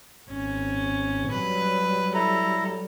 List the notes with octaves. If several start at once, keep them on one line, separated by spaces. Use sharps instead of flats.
G#1 C#4
F#3 G3 B4
E4 A4 A#5